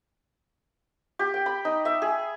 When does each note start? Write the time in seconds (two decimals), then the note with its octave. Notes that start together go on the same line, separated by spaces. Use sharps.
1.19 G4
1.34 G5
1.46 B5
1.65 D#4
1.85 E5
2.02 G#4